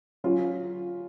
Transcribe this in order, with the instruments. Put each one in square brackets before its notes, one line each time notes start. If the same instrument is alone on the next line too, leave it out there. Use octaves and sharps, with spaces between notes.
[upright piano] F#3 C#4 F4